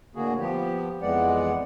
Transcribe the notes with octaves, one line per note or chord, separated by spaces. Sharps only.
A2 D3 A#3 F#4 G#4
F3 B3 G4
F2 E3 G#3 B3 D5 F#5